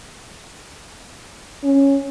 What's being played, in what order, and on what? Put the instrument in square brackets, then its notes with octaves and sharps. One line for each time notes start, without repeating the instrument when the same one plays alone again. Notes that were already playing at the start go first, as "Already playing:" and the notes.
[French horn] C#4